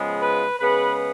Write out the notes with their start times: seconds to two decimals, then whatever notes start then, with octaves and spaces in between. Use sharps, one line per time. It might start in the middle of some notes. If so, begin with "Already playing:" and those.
Already playing: C#3 F3 G#3 B3
0.22 B4
0.59 C#3 G#3 B3 B4